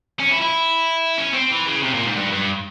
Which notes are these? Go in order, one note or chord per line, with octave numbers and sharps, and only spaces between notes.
C#4
E4
E4
C#4
C4
E3
C#3
C3
A#2
G#2
G2
G2